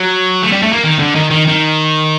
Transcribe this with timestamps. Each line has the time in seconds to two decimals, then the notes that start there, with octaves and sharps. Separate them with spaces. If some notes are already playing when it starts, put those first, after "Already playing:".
Already playing: F#3
0.43 A3
0.52 G3
0.63 A3
0.73 A#3
0.84 D#3
0.99 D3
1.15 D#3
1.30 D#3
1.47 D#3